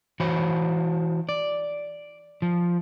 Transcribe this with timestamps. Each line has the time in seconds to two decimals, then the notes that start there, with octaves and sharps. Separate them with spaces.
0.20 E3 F#4 C5 C#5 B5
1.29 D5
2.42 F3